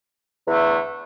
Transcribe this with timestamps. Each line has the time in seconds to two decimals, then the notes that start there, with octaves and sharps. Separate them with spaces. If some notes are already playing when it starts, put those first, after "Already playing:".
0.46 E2 D3 A3